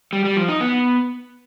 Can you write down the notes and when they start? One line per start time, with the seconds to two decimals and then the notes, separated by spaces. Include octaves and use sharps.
0.13 G3
0.25 G3
0.37 F3
0.49 D#4
0.61 B3